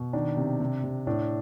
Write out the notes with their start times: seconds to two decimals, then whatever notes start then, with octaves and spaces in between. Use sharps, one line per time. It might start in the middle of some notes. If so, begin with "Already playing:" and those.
Already playing: B2
0.13 D#3 D4
0.37 C3
0.60 C3
0.84 C3
1.07 A2 D4